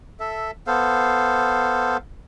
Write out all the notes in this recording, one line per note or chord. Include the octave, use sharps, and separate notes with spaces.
A4 E5
B3 A4 C5 F5